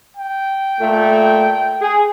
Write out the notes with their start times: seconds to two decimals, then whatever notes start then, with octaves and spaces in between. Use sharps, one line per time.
0.17 G5
0.80 A#2 A3
1.80 G#4